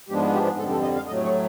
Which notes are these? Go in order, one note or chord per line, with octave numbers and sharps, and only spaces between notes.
G#2 F3 G#3 B3 D4 G4
G4
G#4
F2 D3 G3 A4
A4
D#5
F5
A2 F#3 A3 D#5
C#5